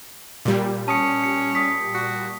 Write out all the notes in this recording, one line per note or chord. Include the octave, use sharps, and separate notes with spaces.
A#2 G3
C#4 A5 D#6 C#7
C#7
D#6 B6
F#4